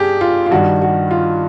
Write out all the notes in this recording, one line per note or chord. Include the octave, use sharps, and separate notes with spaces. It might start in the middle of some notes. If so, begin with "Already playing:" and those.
Already playing: G2 G4 G#4
F4
F4
G2 D#3 G3 F#4
F#4
F4